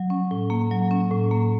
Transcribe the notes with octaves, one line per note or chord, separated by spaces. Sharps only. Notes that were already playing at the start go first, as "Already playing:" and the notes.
Already playing: F#3
C#4
A2
A#3
F#3
C#4
A2
A#3